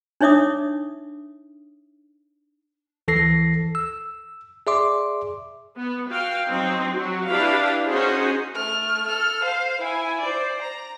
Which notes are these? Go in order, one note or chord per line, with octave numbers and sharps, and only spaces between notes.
D4 D#4 C#5 E5 D6 D#6
D2 E3 A4 A#6 C7
E6
G#4 D5 E5 C6 D6
B3
F#4 F5 G5
F#3 C4 D#4
F#3 F#4
D4 E4 G4 B4 F5
C#4 D#4 F#4 G#4 C5
A3 F6
A4 F6
C5 F5
E4 G#5
C5 D5
A#5